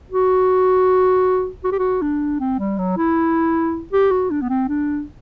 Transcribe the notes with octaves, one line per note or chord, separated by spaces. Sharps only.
F#4
F#4
G4
F#4
D4
C4
G3
F#3
E4
G4
F#4
D4
B3
C4
D4